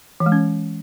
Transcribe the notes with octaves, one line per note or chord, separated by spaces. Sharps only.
E3
G#3
C#4